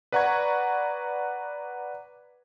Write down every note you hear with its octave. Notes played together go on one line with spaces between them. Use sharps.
B4 D5 F#5 A#5 C#6 G#6